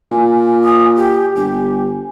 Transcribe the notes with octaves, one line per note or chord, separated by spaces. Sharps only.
A#2 G#5
D#6
G4
G1 G4